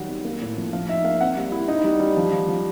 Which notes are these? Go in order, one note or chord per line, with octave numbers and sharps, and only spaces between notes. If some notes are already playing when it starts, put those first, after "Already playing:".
Already playing: D#3 F#3 G3 F#5
B3
A#3
A2
F3
F3 F5
D#4 E5
A#3 F5
C4 F#5
G3
E4
D#4
G3
G3
F3
F3
F3